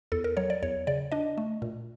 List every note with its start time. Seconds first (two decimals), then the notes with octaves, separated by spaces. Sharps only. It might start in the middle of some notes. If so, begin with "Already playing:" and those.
0.12 E2 A4
0.24 A#4
0.37 F#3 C#5
0.50 D5
0.63 E2 C#5
0.87 C#3 D5
1.12 D4 D#5
1.38 A3
1.62 A#2